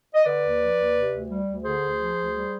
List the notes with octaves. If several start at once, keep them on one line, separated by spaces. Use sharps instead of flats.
D#5
D3 B4 D5
D#2
F3
D#2
C3
D2
G3
D2
D3 G#4 C5
D2
F3
D2
G3